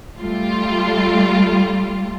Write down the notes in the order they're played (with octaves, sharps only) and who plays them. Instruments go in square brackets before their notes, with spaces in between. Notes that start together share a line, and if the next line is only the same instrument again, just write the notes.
[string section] G3 A3 F4